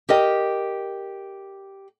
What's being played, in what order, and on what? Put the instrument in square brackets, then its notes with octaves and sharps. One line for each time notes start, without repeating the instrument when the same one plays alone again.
[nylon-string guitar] G4 A#4 D#5 G5